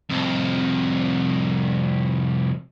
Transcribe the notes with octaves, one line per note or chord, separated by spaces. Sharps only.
C2 F2